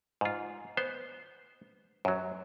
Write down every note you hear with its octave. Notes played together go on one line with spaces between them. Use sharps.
G#2 F4
B3 C5
F#2 F#3